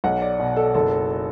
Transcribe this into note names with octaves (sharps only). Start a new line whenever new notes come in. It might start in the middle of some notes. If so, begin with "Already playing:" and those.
B1 F#5
D5
B2
A4
F#1 A4